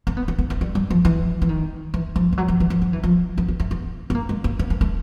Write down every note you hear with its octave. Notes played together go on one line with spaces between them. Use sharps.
C4
B3
C4
B3
A3
G3
G3
F3
E3
E3
D#3
E3
F3
F3
F#3
F3
E3
F3
F3
E3
F3
B3
A#3
A3
B3
B3
A#3
G#3
A#3
B3
A#3
A3